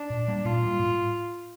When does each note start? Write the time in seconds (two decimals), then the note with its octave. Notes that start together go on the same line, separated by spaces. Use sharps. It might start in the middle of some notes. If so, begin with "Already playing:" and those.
Already playing: D4
0.10 A#2
0.28 G3 A#3
0.45 A#2 F4
0.62 G3 A#3
0.79 A2